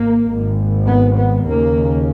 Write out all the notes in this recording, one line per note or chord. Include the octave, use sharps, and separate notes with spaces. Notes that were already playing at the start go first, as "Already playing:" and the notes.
Already playing: G#1 A#3
G#1 G#2
B3
B3
D#2 C#3 A#3